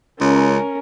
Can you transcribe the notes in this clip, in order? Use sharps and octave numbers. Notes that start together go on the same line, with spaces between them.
C#2 C#4 A#4